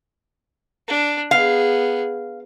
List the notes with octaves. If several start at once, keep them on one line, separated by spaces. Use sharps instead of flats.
D4
B3 G#4 F5